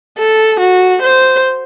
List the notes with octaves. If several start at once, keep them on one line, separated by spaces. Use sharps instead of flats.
A4
F#4
C5